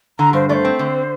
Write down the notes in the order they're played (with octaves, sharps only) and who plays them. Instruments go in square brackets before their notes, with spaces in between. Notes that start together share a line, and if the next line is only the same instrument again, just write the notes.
[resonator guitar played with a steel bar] D3 [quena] A#5
[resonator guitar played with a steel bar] G2 [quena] C5
[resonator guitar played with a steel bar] A3 [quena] C5 D5
[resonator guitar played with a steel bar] C4
D3